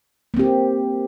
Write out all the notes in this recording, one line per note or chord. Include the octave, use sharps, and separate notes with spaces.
A#3 C4 G4